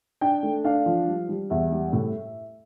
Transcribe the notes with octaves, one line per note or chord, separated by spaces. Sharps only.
D4 G5
A3
D4 F5
F3
G3
G3
E2 E5
G3
A2